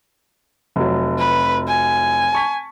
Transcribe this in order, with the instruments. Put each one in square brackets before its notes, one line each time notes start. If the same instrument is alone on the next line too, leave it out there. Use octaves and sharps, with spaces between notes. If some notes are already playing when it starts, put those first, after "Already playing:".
[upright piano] F1 F#3
[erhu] B4
G#5
[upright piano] A5 C#6 B6